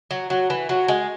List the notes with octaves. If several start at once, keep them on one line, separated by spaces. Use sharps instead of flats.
F#3
F#3 F#4
E3
F#3 F#4
G#3